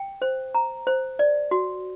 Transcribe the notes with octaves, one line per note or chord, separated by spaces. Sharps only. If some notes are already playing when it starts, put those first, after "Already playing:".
Already playing: G5
C5
A#5
C5
D5
F#4